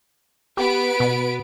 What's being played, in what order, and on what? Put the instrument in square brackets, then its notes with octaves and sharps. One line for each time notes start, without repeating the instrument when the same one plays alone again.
[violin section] B3 B4 D7 [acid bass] G4
[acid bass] B2